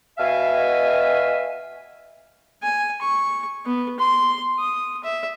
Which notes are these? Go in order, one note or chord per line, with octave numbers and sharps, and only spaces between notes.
B2 E5 F5 G#5
G#5
C#6
B3
C6
D#6
E5